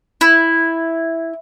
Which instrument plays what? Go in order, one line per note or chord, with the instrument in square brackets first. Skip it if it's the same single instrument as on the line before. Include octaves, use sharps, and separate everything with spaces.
[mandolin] E4